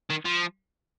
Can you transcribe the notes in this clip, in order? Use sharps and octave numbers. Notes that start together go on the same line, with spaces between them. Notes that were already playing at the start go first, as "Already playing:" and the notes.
D#3
F3